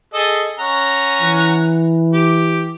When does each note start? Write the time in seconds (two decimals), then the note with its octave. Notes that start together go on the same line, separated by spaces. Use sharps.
0.14 G#4 A4 D#5
0.59 C#4 F#5 A#5
1.21 E3
2.13 G4